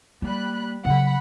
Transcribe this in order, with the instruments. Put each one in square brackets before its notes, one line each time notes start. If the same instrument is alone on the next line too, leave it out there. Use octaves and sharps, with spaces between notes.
[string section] G3 B5 F#6 [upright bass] A#3
[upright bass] C#3 F#3 [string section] F#5 B5